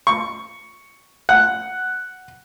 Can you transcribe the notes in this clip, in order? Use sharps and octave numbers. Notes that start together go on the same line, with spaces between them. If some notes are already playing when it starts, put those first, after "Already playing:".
C#6
F#5